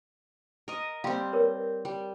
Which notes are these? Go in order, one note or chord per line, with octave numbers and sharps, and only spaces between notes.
A#4 D#5
G3 C4 F5 C6
A#4 B4 C#5
G3